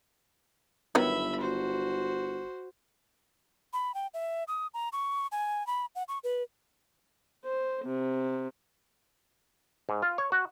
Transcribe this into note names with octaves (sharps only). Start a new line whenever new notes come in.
G1 D#3 F#3 B3 E5 B5
F#4 C5
B5
G5
E5
D#6
A#5
C#6
G#5
B5
F#5
C#6
B4
C5
C3
G#2
F4
C#5
F#4